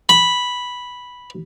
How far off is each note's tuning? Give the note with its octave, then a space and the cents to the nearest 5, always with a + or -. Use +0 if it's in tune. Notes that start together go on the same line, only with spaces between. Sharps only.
B5 -5